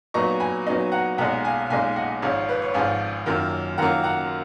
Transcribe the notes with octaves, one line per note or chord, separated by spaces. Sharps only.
A#2 F#3 B3 D#4 A#5 C#6
G#5 B5
A#2 F#3 B3 D#4
F#5 A#5
B1 A#2 G#3 D#4 F#5 A#5
F5 G#5
B1 A#2 G#3 D#4 F5 G#5
D#5 F#5
G#1 G#2 F3 C#5 F5
B4
C#5
G#1 G#2 F3 F5 G#5
F#2 D#3 F#3 A#3 F4
F#2 D#3 F#3 A#3 F4 F#5 A#5
F#5 A#5